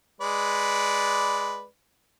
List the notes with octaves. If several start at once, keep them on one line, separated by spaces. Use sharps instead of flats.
G#3 B4 D5